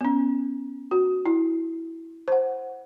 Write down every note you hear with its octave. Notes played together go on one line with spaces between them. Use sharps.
B3 C#4
F#4
E4
C5 F#5